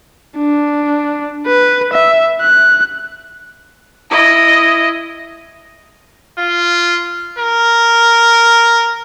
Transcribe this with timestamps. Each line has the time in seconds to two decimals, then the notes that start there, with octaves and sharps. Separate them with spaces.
0.37 D4
1.47 B4
1.93 E5
2.41 F#6
4.11 E4 D#5
6.39 F4
7.39 A#4